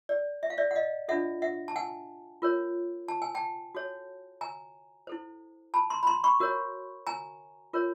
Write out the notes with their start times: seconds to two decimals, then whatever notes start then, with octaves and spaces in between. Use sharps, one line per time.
0.09 D5
0.43 E5
0.50 F5
0.58 D5 E5
0.71 F#5
0.75 D#5 F5
1.08 D4 F4 A4 E5 F#5
1.42 E5 F#5
1.68 A5
1.76 F#5 G#5
2.42 F4 A#4 C#5
3.08 A5
3.22 G#5
3.35 G5 A5
3.75 F#4 A4 C#5
4.41 G#5 A#5
5.07 E4 A4 C5
5.74 A5 B5
5.90 A#5 C6
6.03 B5
6.07 A#5 C6
6.24 B5 C#6
6.40 F#4 A#4 C#5
7.07 G#5 A#5
7.73 F4 A#4 C#5